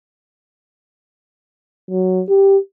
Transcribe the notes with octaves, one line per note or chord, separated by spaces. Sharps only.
F#3
G4